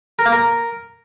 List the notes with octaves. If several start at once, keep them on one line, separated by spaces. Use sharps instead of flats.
A#4
A#3
A#4